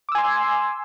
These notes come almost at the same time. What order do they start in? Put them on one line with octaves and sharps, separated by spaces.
D6 E6 G#5 C6